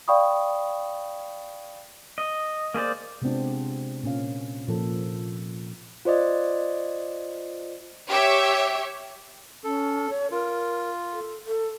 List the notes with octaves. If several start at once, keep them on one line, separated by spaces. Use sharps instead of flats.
D5 F5 G5 B5 C#6 D#6
D#5
A#3 G#4 C5 D5
C3 G#3 B3 C4 D4 F4
A#2 C#4 F5
A#2 F3 A4
F4 C5 D5 D#5
G4 C#5 E5
C#4 A4
C#5
F4 A#4
A4
A4